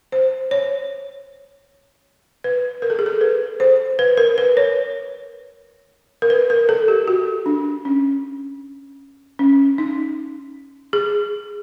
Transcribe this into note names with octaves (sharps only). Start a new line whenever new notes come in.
C5
C#5
B4
A#4
A4
G#4
A4
B4
C5
B4
A#4
B4
C#5
A#4
B4
A#4
A4
G4
F#4
D4
C#4
C#4
D#4
G#4